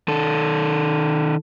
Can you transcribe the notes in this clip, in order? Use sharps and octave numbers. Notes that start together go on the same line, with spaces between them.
D#3 A4